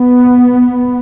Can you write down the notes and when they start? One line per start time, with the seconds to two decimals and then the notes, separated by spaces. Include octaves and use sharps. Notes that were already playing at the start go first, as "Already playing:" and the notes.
Already playing: B3